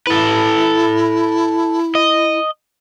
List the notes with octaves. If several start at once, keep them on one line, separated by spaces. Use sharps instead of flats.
E4 A4 B4
D#5